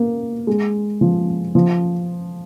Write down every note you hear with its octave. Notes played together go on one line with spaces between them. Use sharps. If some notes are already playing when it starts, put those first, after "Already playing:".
Already playing: A#3
G#3
F3
F3